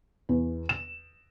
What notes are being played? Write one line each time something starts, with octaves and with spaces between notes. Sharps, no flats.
E2
E7